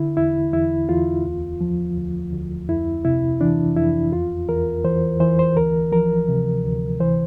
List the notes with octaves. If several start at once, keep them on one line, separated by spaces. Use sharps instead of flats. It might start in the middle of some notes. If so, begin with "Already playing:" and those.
Already playing: D3 E4
E2 E4
E2 E4
E2 F4
D2
F3
D2
D2
F2 E4
C3 E4
E3 D4
F2 E4
E2 F4
E2 A#4
E3 C5
E3 C5
C5
D2 A#4
F3 A#4
C3
D2
E3 C5